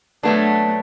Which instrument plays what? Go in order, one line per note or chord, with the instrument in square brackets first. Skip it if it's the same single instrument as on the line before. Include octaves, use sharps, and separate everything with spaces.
[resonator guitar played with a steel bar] B2 F#3 B3 D4 [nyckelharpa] A3